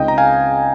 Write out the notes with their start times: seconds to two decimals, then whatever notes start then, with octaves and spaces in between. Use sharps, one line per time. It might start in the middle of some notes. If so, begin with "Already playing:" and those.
Already playing: C#2 C#3 G#3 C4 D#4 D#5 G5
0.08 A#5
0.18 F5 G#5